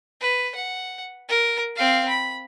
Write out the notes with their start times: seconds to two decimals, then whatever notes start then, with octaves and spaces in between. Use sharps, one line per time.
0.21 B4
0.55 F#5
1.29 A#4
1.76 C4 F5
2.09 B5